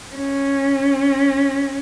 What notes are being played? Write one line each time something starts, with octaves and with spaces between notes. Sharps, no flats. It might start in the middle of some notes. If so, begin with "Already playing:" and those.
C#4